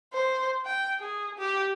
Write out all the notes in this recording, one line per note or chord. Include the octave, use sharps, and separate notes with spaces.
C5
G5
G#4
G4